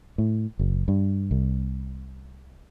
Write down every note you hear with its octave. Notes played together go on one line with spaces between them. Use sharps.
A2
F#1
G2
C2